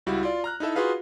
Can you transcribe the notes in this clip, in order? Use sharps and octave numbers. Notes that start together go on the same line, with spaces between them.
C#2 G3 E4 F#4 G4
F4 D5
A#5 F6 F#6
D#4 E4 A4 E5
F4 F#4 G#4 B4 F5